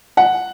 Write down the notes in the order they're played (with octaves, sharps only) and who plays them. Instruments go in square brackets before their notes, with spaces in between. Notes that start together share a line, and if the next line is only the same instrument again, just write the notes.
[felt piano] F#5